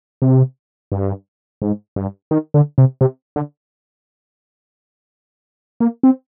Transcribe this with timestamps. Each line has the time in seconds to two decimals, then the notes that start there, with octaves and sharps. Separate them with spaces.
0.22 C3
0.92 G2
1.62 G#2
1.96 G2
2.31 D#3
2.54 D3
2.78 C3
3.01 C3
3.36 D3
5.80 A#3
6.03 C4